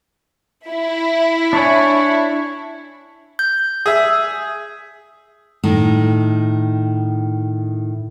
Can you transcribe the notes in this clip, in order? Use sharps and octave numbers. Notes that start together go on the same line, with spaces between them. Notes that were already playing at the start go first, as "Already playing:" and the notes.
E4
D4 C#5 G#5
G6
G#4 E5
A2 D#3